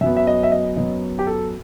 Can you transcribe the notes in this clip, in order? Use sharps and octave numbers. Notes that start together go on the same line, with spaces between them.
F#2 F#3 B3 E5
E5
D#5
E5
D#5
F#2 F#3 B3 D#5
G4
A4